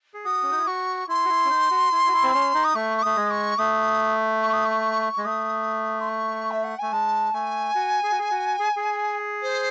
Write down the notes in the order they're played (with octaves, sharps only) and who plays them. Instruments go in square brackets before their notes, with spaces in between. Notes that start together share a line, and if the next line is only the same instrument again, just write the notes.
[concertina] G#4
[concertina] F#4 [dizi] D#6
[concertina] C#4
D#4
E4
[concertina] F#4 [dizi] C#6
[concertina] E4 [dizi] C6
[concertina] F#4
E4
C#4
D#4
F#4
E4
F#4
E4
C4
C#4
D#4
[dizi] D#6
[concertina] A3 [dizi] C#6
[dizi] C#6
[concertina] A3 [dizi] D#6
[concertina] G#3
[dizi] C#6
[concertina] A3 [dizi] D#6
[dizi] C#6
D#6
C#6
[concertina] G#3
[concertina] A3 [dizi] D#6
[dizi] C6
C#6
E5
F#5
[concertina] A3 [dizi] G#5
[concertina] G#3 [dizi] A5
[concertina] A3 [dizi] G#5
[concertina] F#4
G#4
F#4
G#4
F#4
G#4
G#4
[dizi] C5